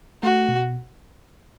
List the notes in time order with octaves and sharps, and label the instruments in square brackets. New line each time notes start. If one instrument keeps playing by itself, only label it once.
[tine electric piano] A3 [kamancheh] F#4
[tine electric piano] B2